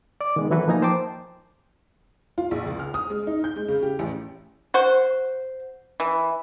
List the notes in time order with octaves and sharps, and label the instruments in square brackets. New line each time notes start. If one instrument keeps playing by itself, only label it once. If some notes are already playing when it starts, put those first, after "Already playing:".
[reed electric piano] D5 D6
D#3 G#3 B3
E3 F#3 E4 F#4 A4 B4
F3 A#3 D#4 G#5 A#5
C5 G5 A5 D6
[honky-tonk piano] F4
A#1
C#2
F6
D#6
G#3
D#4
G6
G#3
C#3
G4
A1
[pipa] F#4 C5
E3